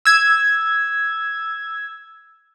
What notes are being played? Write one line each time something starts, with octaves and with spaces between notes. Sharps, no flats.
E6 G#6